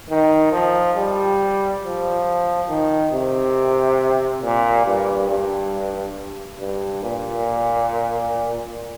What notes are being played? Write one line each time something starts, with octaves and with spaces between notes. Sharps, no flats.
D#3
F3
G3
F3
D#3
C3
A#2
G2
G2
G2
A#2